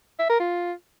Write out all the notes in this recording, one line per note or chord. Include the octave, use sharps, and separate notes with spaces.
E5
A#4
F4